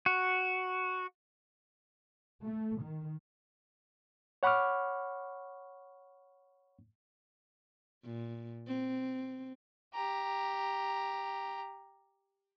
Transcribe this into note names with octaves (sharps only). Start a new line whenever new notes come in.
F#4
A3
D#3
C#5 F#5 B5 C#6 D6 F6
A#2
C4
G4 A#5